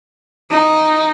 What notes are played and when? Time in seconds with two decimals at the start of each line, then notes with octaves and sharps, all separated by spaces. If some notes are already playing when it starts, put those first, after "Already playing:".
0.50 D#4